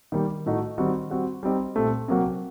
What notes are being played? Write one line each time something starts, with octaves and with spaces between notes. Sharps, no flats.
D#3 G3 A#3
A2 A3 D#4 F#4
D#3 G3 C4 D#4 F#4
G3 C4 F#4
G3 C4 D#4 G4
A#2 A3 C4 G4
C3 F#3 A#3 F#4